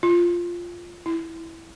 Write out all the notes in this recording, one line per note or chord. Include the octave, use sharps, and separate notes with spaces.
F4
E4